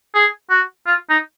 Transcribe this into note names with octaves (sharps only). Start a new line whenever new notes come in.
G#4
F#4
F4
D#4